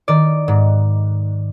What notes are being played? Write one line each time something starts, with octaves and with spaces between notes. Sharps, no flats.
D#3 D5
G#2